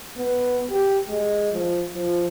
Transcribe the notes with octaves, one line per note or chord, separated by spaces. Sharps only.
B3
G4
G#3
F3
F3